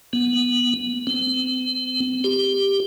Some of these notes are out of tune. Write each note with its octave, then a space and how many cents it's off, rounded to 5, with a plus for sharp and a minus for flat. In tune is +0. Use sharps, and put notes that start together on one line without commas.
B3 -10
C4 -40
G4 +10